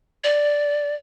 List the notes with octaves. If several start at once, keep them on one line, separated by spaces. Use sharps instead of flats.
D5